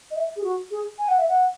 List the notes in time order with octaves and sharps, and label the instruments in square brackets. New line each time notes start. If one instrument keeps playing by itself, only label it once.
[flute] D#5
E5
G#4
F#4
G#4
G#5
F#5
E5
F#5